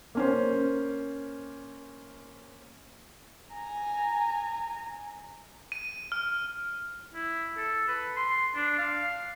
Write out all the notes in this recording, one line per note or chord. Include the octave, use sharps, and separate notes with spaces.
A#3 C#4 C5
G#5 A#5
D#7
F6
E4
A4
B4
C6
D4
F5